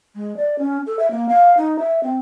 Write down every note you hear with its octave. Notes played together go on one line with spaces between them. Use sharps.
G#3
D5
C#4
A4
E5
A#3
F5
D#4
E5
C4